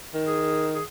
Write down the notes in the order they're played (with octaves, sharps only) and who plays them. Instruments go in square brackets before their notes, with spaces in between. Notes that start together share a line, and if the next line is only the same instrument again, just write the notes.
[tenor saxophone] D#3
[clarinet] G#4
G#4